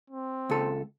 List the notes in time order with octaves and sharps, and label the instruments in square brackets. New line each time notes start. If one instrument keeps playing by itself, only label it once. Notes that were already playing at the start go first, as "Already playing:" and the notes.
[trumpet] C4
[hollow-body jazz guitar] C#2 A4